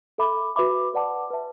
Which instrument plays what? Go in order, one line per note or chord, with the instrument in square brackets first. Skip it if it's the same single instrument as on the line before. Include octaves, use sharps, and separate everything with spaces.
[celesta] A4 E5 B5 D6
F#4 B4 E5 B5 D6
B4 D5 F#5 A5 D6
B4 E5 A5